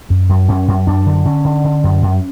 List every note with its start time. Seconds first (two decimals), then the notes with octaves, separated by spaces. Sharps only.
0.10 F#2
0.29 F#2
0.49 F#2 C#4
0.68 F#2
0.87 F#2 D4
1.06 D3
1.26 D3 C#4
1.45 D3
1.64 D3
1.84 F#2
2.02 F#2